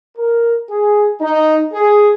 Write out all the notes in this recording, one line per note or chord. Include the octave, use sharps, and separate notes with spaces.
A#4
G#4
D#4
G#4